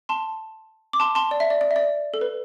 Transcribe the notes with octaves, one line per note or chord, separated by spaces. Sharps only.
A5 C6
D6
A5 C6
A5 C6
D5
E5
D5
D5
E5
D5
A4
B4